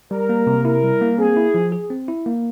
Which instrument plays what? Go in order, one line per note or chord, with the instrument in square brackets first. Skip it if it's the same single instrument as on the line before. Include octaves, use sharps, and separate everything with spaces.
[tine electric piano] G3 [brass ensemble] A#4
[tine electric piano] A#3
C3
[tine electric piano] E4 [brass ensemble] A#4
[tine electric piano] G3
A#3
[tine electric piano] C4 [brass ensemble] G#4
[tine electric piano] E4
F3
G#4
C4
E4
A#3